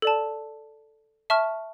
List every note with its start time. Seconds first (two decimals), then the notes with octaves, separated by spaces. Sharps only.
0.02 A4 D5 A5
1.30 E5 A5 C#6 F6